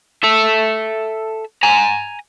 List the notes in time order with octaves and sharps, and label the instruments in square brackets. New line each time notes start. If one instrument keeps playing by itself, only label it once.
[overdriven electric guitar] A4 E5
G#5 A#5